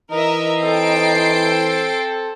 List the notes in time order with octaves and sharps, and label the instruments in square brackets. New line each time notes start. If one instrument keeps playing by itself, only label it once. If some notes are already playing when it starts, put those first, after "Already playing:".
[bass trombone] E3 [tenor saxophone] D#4 [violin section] A#4 D#5 E5
[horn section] C4 A4 [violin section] G5 C7 D7